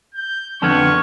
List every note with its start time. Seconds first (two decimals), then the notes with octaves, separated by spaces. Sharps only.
0.15 G6
0.62 F2 D3 B3 A5 C#6 F6 G#6